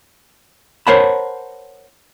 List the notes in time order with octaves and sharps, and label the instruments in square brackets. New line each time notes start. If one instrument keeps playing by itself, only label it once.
[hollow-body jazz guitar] A#4 C5 C#5 F#5 A5 B5